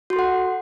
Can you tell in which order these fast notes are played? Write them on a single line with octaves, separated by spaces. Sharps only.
F#4 C6 A4 F#5